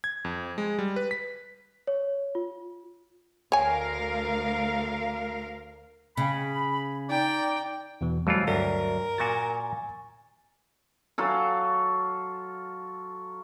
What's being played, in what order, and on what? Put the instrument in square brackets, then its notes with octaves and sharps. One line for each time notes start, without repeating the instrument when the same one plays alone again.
[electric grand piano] G#6
F2
G#3
G3
B4
B6
[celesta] C#5
F4
[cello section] D2 A#4 F5 [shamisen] C#5 G#5
[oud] C#3 [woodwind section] B5
[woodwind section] D#4 D5 [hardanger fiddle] G5
[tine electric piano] E2 B2 E3
[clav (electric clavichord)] F2 E3 F4 [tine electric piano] F#3 G3 A3
[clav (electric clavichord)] D2 [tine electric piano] G2 F#3 [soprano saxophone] A#4
[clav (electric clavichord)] A#2 F#4 [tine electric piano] G#5 C#6 A6
[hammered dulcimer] F#3 F4 A4